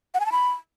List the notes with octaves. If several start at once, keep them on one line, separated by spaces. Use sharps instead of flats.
F#5
G#5
A5
B5